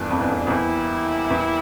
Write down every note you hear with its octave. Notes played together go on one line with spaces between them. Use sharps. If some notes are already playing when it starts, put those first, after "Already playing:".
Already playing: E2 G2 A#2 A3 D4
F2
E2
F2
F2
E2 G3 A#3 E4
E2